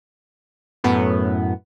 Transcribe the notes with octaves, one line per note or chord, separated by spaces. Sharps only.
F#2 A2 B3